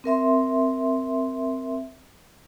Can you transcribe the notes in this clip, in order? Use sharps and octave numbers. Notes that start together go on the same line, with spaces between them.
C4 A#4 E5 C6